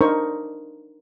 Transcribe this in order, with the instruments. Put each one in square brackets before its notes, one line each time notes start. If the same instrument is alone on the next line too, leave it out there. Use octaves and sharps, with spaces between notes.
[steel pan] D4 D#4 A#4 C5 C#6